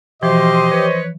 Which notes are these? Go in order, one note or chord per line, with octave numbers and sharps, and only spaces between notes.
B2 E3 F3 G4 C5 D#5 C6
B4 C#5